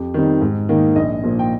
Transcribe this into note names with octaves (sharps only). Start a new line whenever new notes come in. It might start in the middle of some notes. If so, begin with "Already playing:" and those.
Already playing: F2 G4
D#3 G3 C4 D#4
G#2
D#3 A#3 D#4
A#1 D#5
A#2 F3 A#3
G5